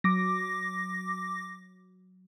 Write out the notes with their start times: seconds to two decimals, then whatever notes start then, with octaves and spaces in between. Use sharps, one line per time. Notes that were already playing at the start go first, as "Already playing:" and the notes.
0.04 F#3 D6 A#6